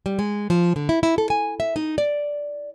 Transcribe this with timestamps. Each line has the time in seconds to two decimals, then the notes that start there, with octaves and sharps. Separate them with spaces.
0.06 G3
0.19 G#3
0.50 F3
0.76 D3
0.89 E4
1.03 E4
1.18 A4
1.30 G#5
1.60 E5
1.76 D#4
1.98 D5